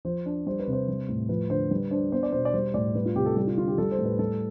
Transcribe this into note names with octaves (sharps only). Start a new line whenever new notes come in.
F3 C5
D4
G3 C5
B4
C3
C5
G3
A2
F3 B4
D3 C5
G3 B4
D4 C5
B3 C5
D5
B2 C5
D5
G3 C5
A2 D5
G3 B4
F4
C3 G4
A4
G3 G4
F4
D3 F4
G4
G3 A4
C5
A2
B4
G3 A4